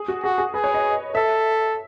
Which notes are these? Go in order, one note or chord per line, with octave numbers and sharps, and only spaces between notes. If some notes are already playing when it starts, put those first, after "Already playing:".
Already playing: G#4
F#4
F#4 G#4
G#4
G#4 B4
C#5
D#5
A4 E5